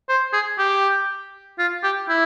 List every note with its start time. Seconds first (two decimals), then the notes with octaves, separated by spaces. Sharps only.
0.09 C5
0.33 G#4
0.58 G4
1.59 F4
1.83 G4
2.09 E4